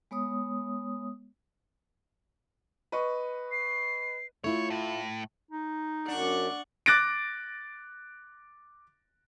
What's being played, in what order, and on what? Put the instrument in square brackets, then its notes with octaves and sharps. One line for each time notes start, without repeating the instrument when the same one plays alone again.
[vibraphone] G#3 B3 C#5 D#6
[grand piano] B4 D#5 C#6
[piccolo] C7
[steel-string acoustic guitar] A3 E4 F4 [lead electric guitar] C#5
[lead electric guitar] A2
[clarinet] D#4
[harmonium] F#2 [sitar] D4 [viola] F#5 C#6
[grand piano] D6 F#6 A6 A#6 D7